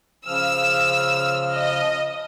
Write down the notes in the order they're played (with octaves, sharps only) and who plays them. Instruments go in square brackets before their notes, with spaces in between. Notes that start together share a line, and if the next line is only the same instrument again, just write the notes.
[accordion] C#3 F3 F6 [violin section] E6
[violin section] D#5